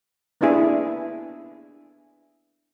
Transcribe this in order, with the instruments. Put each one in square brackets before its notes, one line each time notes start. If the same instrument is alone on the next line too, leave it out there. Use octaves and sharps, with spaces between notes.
[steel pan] A#3 B3 D4 E4 G#4